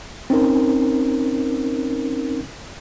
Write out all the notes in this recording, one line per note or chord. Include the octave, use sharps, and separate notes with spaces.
C4 C#4 D#4 A#4